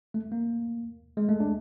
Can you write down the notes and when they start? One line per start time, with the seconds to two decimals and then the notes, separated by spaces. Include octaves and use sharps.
0.14 A3
0.32 A#3
1.17 G#3
1.29 A3
1.40 D4